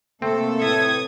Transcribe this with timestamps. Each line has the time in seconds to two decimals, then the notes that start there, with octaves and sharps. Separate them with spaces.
0.22 C3 A3 A#3 C4 A4
0.62 A2 B4 E5 A5 D#6 G#6